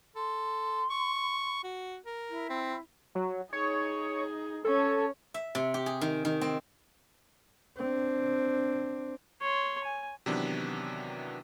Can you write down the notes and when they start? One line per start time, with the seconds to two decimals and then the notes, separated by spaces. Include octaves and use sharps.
0.16 A4 C6
0.90 C#6
1.64 F#4
2.06 A#4
2.30 E4
2.50 C4
3.15 F#3
3.53 D#4 G#4 C#5
4.65 C#4 A4 C#5
5.34 E5
5.55 C3
5.74 G4
5.86 G#4
6.01 D#3
6.25 D#3
6.41 C4
7.78 C4 D4
9.42 C#5 C6
9.84 G#5
10.26 C3 D#3 E3 F#3 B3 D4